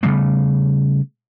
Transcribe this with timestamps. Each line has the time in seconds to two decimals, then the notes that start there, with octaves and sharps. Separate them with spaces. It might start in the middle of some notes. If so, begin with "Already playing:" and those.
0.03 C#3 G3 A3 B3